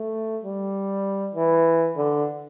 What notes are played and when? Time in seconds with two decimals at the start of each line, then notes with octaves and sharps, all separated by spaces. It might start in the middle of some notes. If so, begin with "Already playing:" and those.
Already playing: A3
0.44 G3
1.35 E3
1.97 D3